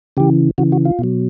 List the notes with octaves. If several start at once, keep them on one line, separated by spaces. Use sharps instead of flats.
C#3 E3 G4
C#3 E3 F#4
F#4
F4
B2 F#3